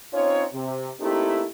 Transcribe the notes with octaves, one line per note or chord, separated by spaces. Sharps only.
C4 C#4 D#4 F4 C5 C#5
C3
A3 A#3 C4 D#4 E4 G4